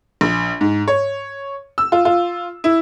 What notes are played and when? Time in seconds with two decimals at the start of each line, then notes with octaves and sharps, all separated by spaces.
0.21 A#1
0.61 G#2
0.88 C#5
1.78 E6
1.92 F4
2.05 F4
2.64 E4